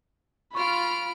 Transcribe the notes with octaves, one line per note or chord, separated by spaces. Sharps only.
F4 B5 C#6 F6 D7